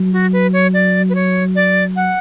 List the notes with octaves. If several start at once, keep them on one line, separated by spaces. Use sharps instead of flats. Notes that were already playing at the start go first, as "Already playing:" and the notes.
Already playing: F#3
F#4
B4
C#5
D5
B4
C#5
D5
F#5